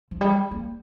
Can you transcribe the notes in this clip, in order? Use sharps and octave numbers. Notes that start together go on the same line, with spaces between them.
F3
G3
A#3